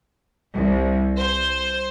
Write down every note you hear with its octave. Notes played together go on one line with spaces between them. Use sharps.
C2
C5